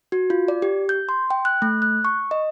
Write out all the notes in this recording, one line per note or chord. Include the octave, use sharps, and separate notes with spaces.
F#4
F4
D5
G4
G6
C6
G5
F#6
A3
F#6
C#6
D#5